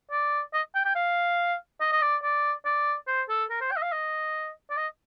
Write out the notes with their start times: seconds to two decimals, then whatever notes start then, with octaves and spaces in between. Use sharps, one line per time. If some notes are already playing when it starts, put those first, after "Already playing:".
0.11 D5
0.53 D#5
0.75 G5
0.85 G5
0.95 F5
1.80 D#5
1.92 D#5
2.01 D5
2.23 D5
2.65 D5
3.07 C5
3.29 A4
3.50 A#4
3.61 C5
3.71 G5
3.76 D#5
3.82 F5
3.92 D#5
4.70 D5
4.77 D#5